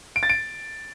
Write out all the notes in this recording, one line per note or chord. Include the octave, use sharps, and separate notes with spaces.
D7
A6
D7